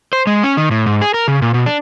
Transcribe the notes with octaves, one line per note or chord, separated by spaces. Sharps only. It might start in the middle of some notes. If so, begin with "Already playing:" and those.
C5
G#3
C#4
D#3
A2
G#2
G#4
A#4
C#3
A#2
B2
D4